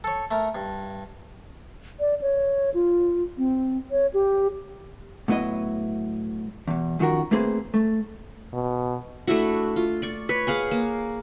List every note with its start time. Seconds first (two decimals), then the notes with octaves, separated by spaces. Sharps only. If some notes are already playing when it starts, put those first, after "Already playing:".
0.04 A4 C#5
0.31 A3 A#4
0.55 G2
2.00 D5
2.22 C#5
2.74 F4
3.38 C4
3.91 C#5
4.14 G4
5.28 A2 F#3 B3 E4 D#5
6.68 E2 B2
6.99 F#2 D#3 F3 F#4 A#4
7.31 A3 A#3 C4 G#4 B4 C5
7.74 A3
8.53 B2
9.27 A3 D4 E4 F#4
9.76 F4
10.02 D5 C#6
10.29 B4 C#5
10.47 G#4 F5 F#5 G#5
10.71 A#3